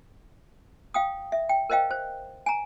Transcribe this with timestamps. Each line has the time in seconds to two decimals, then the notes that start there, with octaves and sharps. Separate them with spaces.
0.94 F5 G5 D#6
1.32 E5
1.49 G5
1.70 A#4 C5 D#5 F5 G5
1.91 C5
2.46 G#5 A#5